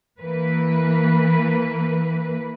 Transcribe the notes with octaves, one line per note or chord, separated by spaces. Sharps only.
E3 A#3 B4